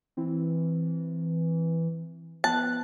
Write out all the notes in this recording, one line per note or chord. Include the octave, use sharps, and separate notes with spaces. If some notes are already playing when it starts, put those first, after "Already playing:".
E3 C4 E4
F3 B3 A5 F#6